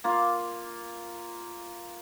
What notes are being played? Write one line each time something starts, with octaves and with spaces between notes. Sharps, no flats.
A#3 F4